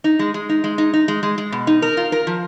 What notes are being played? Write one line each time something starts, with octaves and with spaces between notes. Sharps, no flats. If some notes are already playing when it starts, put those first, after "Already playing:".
D#4
G#3
G#3
D#4
G#3
D#4
D#4
G#3
G#3
G#3
B2
D#4
A#4
F4
A#4
F3